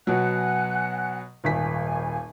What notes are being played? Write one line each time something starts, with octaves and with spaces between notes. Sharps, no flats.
B2 F#3 F#5 G#5 F#6
D#1 G#1 G#5 B6